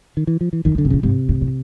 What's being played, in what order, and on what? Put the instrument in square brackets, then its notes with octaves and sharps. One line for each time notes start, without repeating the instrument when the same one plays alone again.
[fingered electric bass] D#3
E3
F3
E3
[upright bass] E2 [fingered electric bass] D#3
[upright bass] F2
[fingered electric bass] D3
[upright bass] F#2 [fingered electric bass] C3
[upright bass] A#2 [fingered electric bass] C#3
[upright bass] G#2 [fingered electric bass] C3
[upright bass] G#2
A2